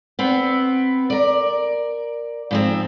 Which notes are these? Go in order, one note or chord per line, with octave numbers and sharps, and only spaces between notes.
B3 C4
A#4 D5
G#2 F3 C4